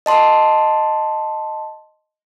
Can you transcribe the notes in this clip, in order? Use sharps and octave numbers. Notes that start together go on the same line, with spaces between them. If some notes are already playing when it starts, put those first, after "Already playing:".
D#5 A5 C6